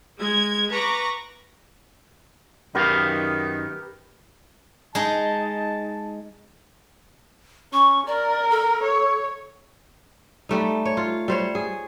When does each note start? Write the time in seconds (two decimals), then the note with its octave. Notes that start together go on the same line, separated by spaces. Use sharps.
0.19 G#3 G#6
0.71 B4 A#5 C#6 D6
2.75 F#2 D#3 B3 G4 A#4 B4 F5
4.95 G#3 D#4 A5
7.73 C#4 C#6
8.07 A#4 D5
8.50 A4
8.84 C#5
10.49 G3 A3 D#4
10.85 C#5
10.97 F4
11.28 G3 C5 C#5
11.55 G#4